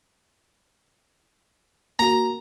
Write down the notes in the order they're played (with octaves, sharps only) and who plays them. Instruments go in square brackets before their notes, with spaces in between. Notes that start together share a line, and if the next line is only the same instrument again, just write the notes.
[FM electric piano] A#3 F#4 [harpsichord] A#5